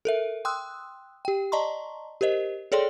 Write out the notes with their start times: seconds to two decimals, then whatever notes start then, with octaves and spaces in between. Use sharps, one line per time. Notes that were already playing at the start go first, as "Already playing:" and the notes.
0.05 A4 A#4 E5
0.45 G5 C6 D#6 E6 F#6
1.25 G4 G5
1.52 D5 D#5 A5 A#5 C6 C#6
2.21 G4 A#4 C5 D#5
2.72 G#4 A4 C#5 D5 G5 C6